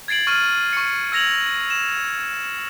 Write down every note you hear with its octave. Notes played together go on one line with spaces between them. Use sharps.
G#6 A6 C7 D7 F#7
C#6 F6 A6 D#7
C#6 C#7
E6 G#6 A#6 F7 F#7
E7